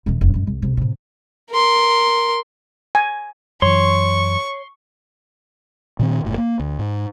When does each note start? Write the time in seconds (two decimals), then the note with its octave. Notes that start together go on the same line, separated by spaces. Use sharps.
0.06 D#1 D#3
0.21 F1
0.34 F#2 G#3
0.47 C2
0.62 B1 C3
0.77 A2 C3
1.51 A#4 C6
2.95 G#5
3.62 F#2 E3 C#5 C6 C#6
5.99 A#2 D#3 C4
6.25 F#1 A2
6.38 A#3
6.60 D2
6.79 G#2